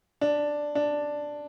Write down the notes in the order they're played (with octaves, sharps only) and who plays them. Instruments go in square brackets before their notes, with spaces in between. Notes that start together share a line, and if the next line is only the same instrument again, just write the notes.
[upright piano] D4
D4